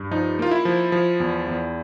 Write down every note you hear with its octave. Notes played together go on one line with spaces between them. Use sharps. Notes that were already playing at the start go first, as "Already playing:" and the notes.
Already playing: G2
F3 D#4
A#3 F4
E4
F3
F3
E2
E2